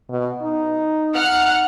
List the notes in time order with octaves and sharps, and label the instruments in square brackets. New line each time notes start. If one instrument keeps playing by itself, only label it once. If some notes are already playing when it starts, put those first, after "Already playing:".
[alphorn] B2
D#4
[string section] F#5 F6